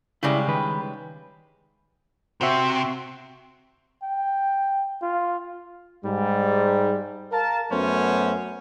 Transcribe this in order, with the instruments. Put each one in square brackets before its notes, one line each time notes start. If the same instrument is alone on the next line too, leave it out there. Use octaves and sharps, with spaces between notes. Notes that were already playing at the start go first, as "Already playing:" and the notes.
[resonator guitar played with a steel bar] C#3 G3 G#3 [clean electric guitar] E4 D5
[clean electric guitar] D#3 B4
[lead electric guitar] C3 [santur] C4 F#4 E5
[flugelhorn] G5
F4
[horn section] G#2 G3
A#4 F5 A5
F#2 F#3 A3 B3 C#4 C5